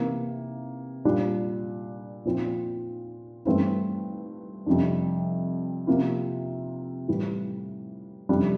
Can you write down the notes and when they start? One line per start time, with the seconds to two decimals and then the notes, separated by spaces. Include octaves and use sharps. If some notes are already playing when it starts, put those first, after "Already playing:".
Already playing: C3 E3 A#3
1.05 A#2 G3 A#3 D4
2.25 A#2 F3 C4 E4
3.45 G2 E3 A3 C4 E4
4.66 F2 C3 G3 D4
5.87 C3 F3 A#3 E4
7.08 A2 E3 G3
8.29 F2 C3 G3 D4